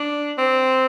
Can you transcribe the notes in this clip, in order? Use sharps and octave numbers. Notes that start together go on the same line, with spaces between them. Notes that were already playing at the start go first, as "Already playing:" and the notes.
Already playing: D4
C4